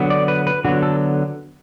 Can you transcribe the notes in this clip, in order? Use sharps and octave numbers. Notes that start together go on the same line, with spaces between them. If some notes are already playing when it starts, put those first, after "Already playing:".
Already playing: D3 F#3 B3
D5
B4
B4
D3 F#3 B3 F#4
A4